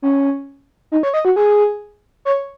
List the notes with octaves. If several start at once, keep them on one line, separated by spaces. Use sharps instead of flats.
C#4
D#4
C#5
D#5
F#4
G#4
C#5